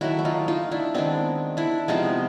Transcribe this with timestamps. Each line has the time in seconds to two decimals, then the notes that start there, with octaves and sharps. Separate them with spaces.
0.01 D#3 F#3 A3 E4 F#4
0.19 E4
0.25 D#4 F4
0.48 D#4 F4
0.71 D4 E4
0.95 D#3 G#3 B3 C4 D4
1.57 D4 E4
1.88 C3 F3 G#3 B3 D#4 F4